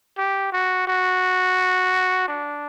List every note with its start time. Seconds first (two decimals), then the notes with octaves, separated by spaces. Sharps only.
0.17 G4
0.52 F#4
0.87 F#4
2.28 D4